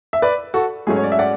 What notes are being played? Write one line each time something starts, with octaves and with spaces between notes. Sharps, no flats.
E5
B4 D5
F#4 A4
G#2 F#3 A3 C#4 G#4
C#5
D5
E5
D5 F#5